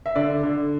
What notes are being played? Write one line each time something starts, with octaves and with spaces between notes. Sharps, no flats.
E5
D3 D5
D3